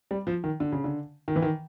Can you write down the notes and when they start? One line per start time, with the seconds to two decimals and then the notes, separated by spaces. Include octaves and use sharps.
0.11 G3
0.27 F3
0.44 D#3
0.60 D3
0.72 C#3
0.84 D3
1.28 D#3
1.36 E3
1.42 D#3